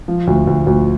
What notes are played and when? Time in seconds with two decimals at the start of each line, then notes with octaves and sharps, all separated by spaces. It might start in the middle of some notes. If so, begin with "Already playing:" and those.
0.08 F3
0.27 D2
0.47 D2
0.67 D2